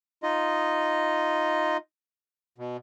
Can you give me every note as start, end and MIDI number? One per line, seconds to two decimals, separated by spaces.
0.23 1.77 63
0.23 1.77 65
0.23 1.77 75
2.58 2.77 47